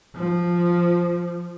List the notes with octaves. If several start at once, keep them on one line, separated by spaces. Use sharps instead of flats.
F3